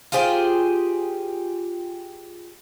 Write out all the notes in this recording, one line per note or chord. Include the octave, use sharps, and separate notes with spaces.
F4 G4 G#4 C5